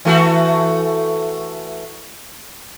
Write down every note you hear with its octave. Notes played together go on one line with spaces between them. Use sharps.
E3 A3 F#4